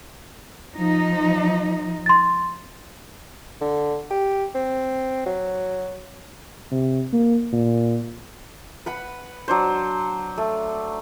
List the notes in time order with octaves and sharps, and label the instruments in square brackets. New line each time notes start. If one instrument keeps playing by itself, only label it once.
[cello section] F3 D#4
[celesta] C6 A6
[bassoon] D3
G4
C4
F#3
[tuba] C3
A#3
A#2
[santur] B4 F#5 B5
F#3 D4 C5
A3